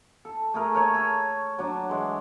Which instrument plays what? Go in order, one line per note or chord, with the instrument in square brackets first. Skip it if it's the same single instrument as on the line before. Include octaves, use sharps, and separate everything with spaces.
[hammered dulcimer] A4
A3 G#4 A#4
A#4 C#5 G#5
A4
F#3 D4
E3 G#3